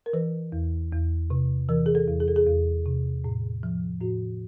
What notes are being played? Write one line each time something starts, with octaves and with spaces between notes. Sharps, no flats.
A#4
E3 B4
E2
E2
C3
E3 A#4
G#4
A4
E2
G#4
A4
G#4
E2
C3
A2
F3
A2 F#4